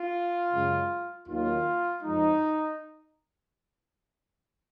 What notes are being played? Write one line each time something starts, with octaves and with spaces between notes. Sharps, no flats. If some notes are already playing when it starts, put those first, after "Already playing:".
Already playing: F4
F#2 C#3 G#3
D#2 D#3 F#3 A#3 F4
F2 F3 G#3 D#4